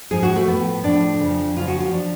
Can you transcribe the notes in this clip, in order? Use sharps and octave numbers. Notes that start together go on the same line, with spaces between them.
G#2 F3 G#4
F#4
A3
A2 F3 B3
A2 F3 D4
F2 C#3 F3
F2 C#3 F3 F4
F#4
F4
F3 D4